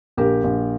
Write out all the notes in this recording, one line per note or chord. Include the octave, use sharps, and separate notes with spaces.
A#1 G4 A#4
A#1